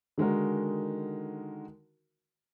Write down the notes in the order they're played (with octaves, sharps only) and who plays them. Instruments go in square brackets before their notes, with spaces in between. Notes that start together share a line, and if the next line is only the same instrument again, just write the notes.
[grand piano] D3 D#3 G#3 D#4 F#4 A#4